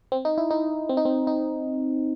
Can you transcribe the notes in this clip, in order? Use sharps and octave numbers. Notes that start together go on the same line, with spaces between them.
C4
D#4
E4
D#4
C4
D#4
C4
D#4